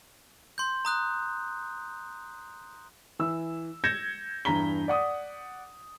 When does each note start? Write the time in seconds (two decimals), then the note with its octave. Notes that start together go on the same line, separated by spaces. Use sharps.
0.58 C6 G6
0.85 A#5 D#6 F#6
3.19 E3 E6
3.84 G6 G#6 A#6 C#7 E7
4.45 E2 G2 A#5 B6 G7
4.88 D5 F#5 D#6